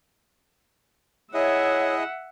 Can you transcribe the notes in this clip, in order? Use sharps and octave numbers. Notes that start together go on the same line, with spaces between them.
E4 G#4 C#5 D#5 E5 F#5